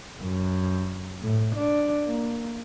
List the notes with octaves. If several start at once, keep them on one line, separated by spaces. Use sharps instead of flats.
F#2
A2
D4
A#3